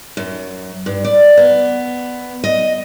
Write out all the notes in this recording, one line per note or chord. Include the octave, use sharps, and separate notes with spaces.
F#2
G2
D5
B3
D#5